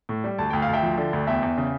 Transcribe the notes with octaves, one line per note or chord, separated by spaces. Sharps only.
A2
G3
D2 A5
D2 G5
F5
D2 E5 G5
F3
D3
D2
E2 E5 G5
E2
C#3